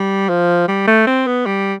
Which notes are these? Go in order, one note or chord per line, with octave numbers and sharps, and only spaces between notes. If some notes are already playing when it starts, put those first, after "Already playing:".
Already playing: G3
F3
G3
A3
C4
B3
G3